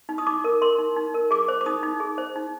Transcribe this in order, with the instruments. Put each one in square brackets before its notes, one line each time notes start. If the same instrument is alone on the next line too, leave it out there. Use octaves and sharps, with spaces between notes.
[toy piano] D#4
D#6
D#4 D6
A#4
A#4 C6
D#4
D#4
A#4
G#4 D6
C5
D6
D#4 D#6
D#4
G#4
C5
D#4